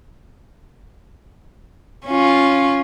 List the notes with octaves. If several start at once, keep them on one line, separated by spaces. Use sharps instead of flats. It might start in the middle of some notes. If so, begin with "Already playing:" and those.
C#4 F4